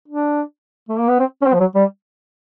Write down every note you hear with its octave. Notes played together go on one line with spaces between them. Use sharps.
D4
A3
A#3
B3
C4
C#4
C4
F3
F#3
G3